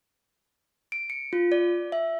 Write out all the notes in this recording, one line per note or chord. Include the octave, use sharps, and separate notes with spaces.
D7
C#7
F4
D5
E5